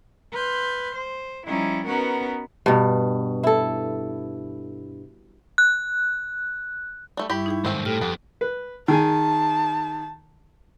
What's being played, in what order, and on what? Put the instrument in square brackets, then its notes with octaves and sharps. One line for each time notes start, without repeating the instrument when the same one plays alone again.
[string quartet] B4 C6 F6 G6
C5
F3 G3 C#4 D#4 E4
B3 C#4 D#4 F#4 A#4 B4
[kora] G2 B2
E4 A4
[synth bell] F#6
[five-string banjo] G3 A3 D4
[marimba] G2 G3 [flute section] E4 C#6 [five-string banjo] G4 B5
[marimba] D#4 G#4 G5
[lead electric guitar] D#2 G#2 [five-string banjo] A3 C4 C5
[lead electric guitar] A2 [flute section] G4 A4 G5 [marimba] F6
[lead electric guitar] F2 [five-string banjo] B3
[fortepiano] B4
[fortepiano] D#3 G#4 G#5 [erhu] A5